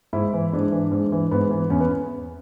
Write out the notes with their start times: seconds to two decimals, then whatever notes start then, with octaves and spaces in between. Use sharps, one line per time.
0.13 G#2 E4
0.33 E3
0.53 G#2 D4
0.72 E3
0.92 G#2
1.12 E3
1.31 G#2 B3
1.51 E3
1.70 E2 C#4
1.80 B3